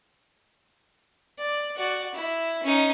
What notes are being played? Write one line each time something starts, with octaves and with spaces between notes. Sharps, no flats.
D5
F#4 D5
E4
C#4 D#4